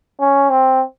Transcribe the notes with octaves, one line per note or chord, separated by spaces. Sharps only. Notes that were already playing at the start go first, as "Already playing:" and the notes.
C#4
C4